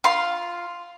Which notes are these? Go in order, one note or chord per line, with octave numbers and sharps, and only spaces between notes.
F4 C6